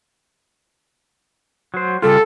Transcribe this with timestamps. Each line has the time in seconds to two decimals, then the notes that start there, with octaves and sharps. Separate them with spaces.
1.74 F#3 C5
2.02 C#3 G3 F4 A4